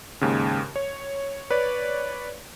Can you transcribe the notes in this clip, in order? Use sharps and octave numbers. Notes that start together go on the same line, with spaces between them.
D#2 G#2 C#3
C#5
B4 C#5 D5